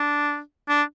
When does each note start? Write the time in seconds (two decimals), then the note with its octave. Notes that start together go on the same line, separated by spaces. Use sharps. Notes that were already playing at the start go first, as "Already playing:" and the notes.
Already playing: D4
0.69 D4